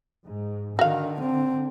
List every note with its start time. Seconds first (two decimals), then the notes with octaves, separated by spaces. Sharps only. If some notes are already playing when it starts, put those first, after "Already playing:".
0.24 G#2
0.79 D3 D#3 F#4 F5
1.20 C4